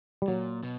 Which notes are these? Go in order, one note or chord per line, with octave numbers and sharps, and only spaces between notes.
G3
A#2 F#3
B2